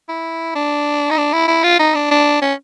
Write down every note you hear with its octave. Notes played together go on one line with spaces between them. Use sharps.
E4
D4
D#4
D4
E4
E4
F4
D#4
D4
D4
C#4